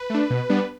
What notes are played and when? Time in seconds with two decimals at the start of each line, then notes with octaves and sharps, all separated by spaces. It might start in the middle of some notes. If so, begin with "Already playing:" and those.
Already playing: B4
0.10 A3 D4
0.30 B2
0.49 G3 B3 D4